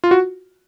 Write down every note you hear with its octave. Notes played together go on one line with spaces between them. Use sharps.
F4
F#4